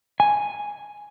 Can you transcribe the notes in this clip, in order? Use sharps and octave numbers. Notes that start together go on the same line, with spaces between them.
G#5